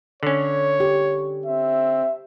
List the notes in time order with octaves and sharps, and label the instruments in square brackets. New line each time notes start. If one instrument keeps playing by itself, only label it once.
[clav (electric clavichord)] D3 C#4 [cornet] C#5
[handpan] G4
[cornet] C4 [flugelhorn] E5